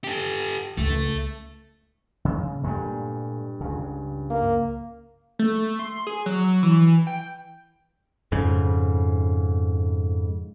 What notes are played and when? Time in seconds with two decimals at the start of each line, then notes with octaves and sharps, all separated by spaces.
0.04 G4 A4
0.77 C#2 A3
2.25 C#3
2.63 G2 A#2 G#3 A3
3.61 C#2 C#3
4.30 A#3
5.39 A3
5.79 C6
6.07 G#4
6.26 F#3
6.63 E3
7.07 G5
8.32 F2 G#2 C#3